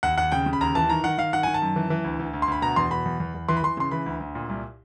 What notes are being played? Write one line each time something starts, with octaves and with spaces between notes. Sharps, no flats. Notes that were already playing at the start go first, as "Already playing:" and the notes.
D#2 F#5
D#2 F#5
C#3 G5
C#3
B5
D#2 A#5
E3 A5
D#3 A#5
D#3 F#5
D#3 F5
D#3 F#5
D#3 G#5
A5
F#2
E3
E3
D2
D2
D2
C6
D2 B5
B2 A#5
E2 C6
B2 B5
E2
E2
E2
E3 C6
B5
E3 C6
C#3 C6
E3 B5
D2
D2
A#2
C2